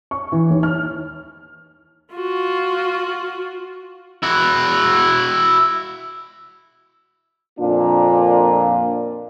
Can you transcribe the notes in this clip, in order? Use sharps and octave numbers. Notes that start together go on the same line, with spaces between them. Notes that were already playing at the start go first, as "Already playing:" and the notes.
C#6
E3
D#2
F6
F4 F#4
E4 F#4
F2 A#2 A#3 D4 F4